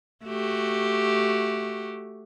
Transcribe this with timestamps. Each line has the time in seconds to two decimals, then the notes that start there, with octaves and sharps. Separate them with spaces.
0.25 A3 F#4 G4